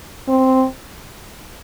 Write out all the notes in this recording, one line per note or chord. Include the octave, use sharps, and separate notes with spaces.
C4